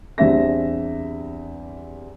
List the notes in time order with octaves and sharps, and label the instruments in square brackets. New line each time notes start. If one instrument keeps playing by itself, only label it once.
[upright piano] E2 G3 C4 D4 E5 A#6